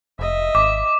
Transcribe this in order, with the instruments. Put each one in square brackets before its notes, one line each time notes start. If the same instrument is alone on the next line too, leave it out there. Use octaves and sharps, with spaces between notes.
[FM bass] F1 [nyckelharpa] D#5 E5
[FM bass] G#1 [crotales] D6